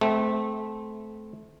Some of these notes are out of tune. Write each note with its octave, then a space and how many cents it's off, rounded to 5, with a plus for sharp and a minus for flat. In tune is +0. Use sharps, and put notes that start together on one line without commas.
A3 -25 C4 -20